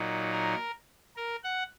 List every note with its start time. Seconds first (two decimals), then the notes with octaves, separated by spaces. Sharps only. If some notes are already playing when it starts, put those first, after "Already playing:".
Already playing: A#2 F#3 D#4
0.32 A#4
1.16 A#4
1.44 F#5